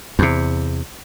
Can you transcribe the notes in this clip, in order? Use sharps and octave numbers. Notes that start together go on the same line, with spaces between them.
E2 C3